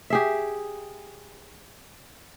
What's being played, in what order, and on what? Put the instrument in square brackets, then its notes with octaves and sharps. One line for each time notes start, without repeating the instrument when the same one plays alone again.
[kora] G4 G#4 E5